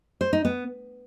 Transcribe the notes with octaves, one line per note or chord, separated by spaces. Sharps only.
C5
D#4
B3